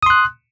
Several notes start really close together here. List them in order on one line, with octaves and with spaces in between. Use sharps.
D#6 C6 F#6